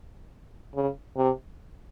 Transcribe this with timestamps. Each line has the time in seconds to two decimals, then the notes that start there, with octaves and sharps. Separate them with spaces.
0.75 C#3
1.17 C3